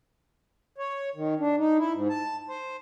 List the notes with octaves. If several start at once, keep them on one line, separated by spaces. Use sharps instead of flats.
C#5
D#3
D4
D#4
E4
G#2
A5
C5